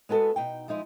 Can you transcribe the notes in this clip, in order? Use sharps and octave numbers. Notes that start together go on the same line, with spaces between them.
G#3 B3 F#4 A4 B4
B2 D#4 G5
F3 G#3 D#4 E4